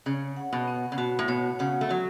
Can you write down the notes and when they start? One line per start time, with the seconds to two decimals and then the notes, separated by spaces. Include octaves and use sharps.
0.06 C#3 C#5
0.37 F#5
0.53 B2
0.67 B3
0.92 C#3
0.98 B2 F#4
1.19 A2
1.28 B2 C#5
1.59 C#3 F#5
1.81 A3
1.89 F#3 F#4